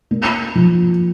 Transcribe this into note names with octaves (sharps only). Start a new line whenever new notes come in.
A#3
F3